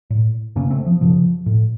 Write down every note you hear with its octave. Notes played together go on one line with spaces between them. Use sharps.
A2
F#2 C#3 A#3 C#4
A3 C4
F3
F#2 C#3 F3
A2